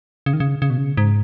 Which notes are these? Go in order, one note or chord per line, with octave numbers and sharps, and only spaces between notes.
C#3
D#3
C#3
C#3
B2
C#3
G#2